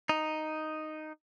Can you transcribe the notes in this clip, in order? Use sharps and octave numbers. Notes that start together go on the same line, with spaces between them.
D#4